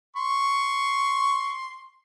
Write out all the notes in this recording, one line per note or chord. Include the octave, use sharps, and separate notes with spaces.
C6 C#6